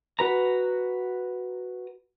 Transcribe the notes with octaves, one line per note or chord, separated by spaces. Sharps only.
F#4 B4 A#5